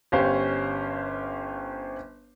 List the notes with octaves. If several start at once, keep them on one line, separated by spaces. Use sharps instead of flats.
G1 C#4 G4 C5 F5